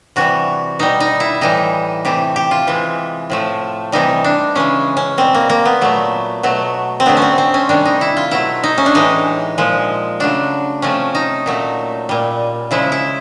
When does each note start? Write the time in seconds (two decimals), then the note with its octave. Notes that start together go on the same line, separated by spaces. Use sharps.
0.16 C3 E3 G3 F#4
0.79 B2 G3 D#4
1.00 D#4
1.20 E4
1.41 A2 E3 G3 D#4
2.05 C3 E3 A3 G4
2.36 G4
2.51 F4
2.67 C3 E3 G#3
3.30 A2 F3 A3
3.92 C3 E3 G3 D#4
4.24 D4
4.55 C#3 E3 G#3 C#4
4.97 C#4
5.18 B2 G3 C4
5.34 A#3
5.49 A#3
5.65 B3
5.81 A#2 F#3 A3
6.43 B2 F#3 A3
7.00 C4
7.06 D3 F#3 A3 B3
7.17 C4 C#4
7.38 C4
7.54 C#4
7.69 C3 D#3 G3 D4
7.85 D#4
8.01 E4
8.17 F4
8.31 B2 F#3 A3 E4
8.64 D#4
8.78 C#4
8.86 D4
8.94 A2 E3 G#3 D#4
9.58 A#2 F3 G#3
10.20 C#3 F#3 A3 D4
10.82 C3 F3 A3 C#4
11.15 D#4
11.46 A#2 F#3 A3
12.09 A#2 G3
12.71 C#3 F3 G#3 E4
12.92 E4